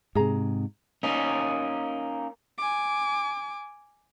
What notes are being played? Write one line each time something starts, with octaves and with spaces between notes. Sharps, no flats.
G#2 C3 G#4 A#5
A#3 C#4 D#4
G#5 D6